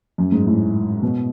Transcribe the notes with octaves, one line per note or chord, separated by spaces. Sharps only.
F#2
G#2
A2
B2